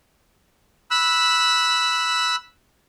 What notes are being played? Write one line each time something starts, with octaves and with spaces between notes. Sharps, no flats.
B5 E6 F#6